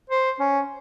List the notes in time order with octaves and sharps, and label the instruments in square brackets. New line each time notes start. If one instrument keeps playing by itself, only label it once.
[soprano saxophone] C5
C#4